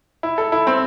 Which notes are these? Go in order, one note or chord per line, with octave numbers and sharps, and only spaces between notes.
E4
A4
E4
C4